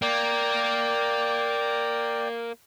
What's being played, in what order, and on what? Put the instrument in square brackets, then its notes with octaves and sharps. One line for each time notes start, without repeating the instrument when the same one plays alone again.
[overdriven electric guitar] A#3 [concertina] D5 G5